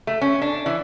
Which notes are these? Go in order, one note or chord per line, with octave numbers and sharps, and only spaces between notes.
A3
C#4
D4
E3